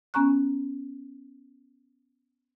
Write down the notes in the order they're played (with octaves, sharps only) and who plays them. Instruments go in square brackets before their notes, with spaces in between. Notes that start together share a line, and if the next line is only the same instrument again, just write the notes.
[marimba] B3 C#4 G#5 A#5 C#6 F#6